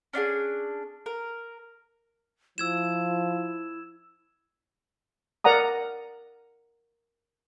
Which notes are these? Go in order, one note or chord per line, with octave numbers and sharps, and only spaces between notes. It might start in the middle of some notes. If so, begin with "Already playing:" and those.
C#4 D4 F#4 G#4
A#4
F3 E4 E6 G#6 E7
A#4 D5 F#5 A#5 D#6